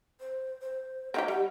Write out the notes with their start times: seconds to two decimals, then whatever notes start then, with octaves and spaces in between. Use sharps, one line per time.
0.20 C5
0.61 C5
1.14 C4 D#4 G4 E5
1.28 G3 F#5